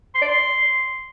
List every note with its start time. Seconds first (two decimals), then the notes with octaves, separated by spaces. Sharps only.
0.15 C6
0.22 D5
0.29 C6